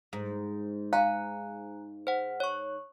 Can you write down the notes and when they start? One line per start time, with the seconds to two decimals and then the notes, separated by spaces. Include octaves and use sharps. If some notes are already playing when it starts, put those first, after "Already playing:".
0.13 G#2
0.93 F5 G#5 A#5 F#6
2.07 C5 F#5
2.40 C#5 C#6